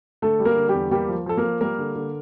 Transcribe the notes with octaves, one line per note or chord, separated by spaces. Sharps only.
D3 A3 A4
G3
A#3 A#4
D3
G3 G4
E2
G3 A#3 G4
F3
F3 A4
A#3 A#4
F3
G3 A#3 A#4
D3
D3